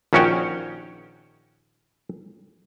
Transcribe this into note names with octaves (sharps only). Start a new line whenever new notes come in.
A#1 D#3 C#4 F#4 C#5 G5